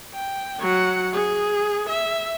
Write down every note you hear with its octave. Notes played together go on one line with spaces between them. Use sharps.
G5
F#3 F#5
G#4
E5